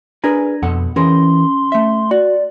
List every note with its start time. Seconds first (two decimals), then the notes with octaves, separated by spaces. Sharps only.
0.24 D4 G#4 A#4 B4 G#5 A#5
0.62 F2 B2 A4 F#5
0.96 E3 C#4 G#4 A#4 C6
1.72 A3 E5
2.11 F#4 D5